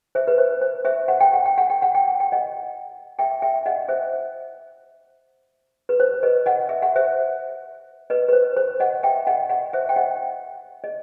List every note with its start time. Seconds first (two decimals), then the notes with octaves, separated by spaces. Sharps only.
0.15 C5 E5
0.27 B4
0.38 C5
0.62 C5
0.85 C5 E5
1.08 F#5
1.20 G5
1.33 F#5
1.46 G5
1.58 F#5
1.70 G5
1.82 F#5
1.95 G5
2.08 F#5
2.20 G5
2.32 D#5 F#5
3.19 E5 G5
3.42 E5 G5
3.66 D#5 F#5
3.88 C5 E5
5.89 B4
6.00 C5
6.23 B4 D#5
6.46 D#5 F#5
6.69 E5
6.82 F#5
6.96 C5 E5
8.10 B4 D#5
8.29 B4
8.33 C5
8.56 C5
8.80 D#5 F#5
9.03 E5 G5
9.27 D#5 F#5
9.49 D#5 F#5
9.73 C5 E5
9.89 G5
9.96 D#5 F#5
10.84 D#5